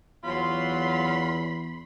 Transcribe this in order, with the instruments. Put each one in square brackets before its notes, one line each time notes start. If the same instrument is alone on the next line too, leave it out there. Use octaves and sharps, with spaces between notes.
[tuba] E2 [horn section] F#3 [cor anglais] F4 [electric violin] B5 C6